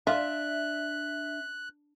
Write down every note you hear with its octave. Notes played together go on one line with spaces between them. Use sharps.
D4 F4 E5 F#6